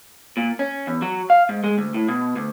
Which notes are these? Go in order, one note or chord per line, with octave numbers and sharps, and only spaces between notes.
A#2
C#4
E2
F#3
F5
G#2
G#3
D2
A2
B2
D2